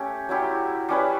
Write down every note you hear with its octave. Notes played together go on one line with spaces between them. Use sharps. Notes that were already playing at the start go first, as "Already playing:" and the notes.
Already playing: A3 C#4 G4
F#3 C#4 E4 G4
G3 C#4 E4 B4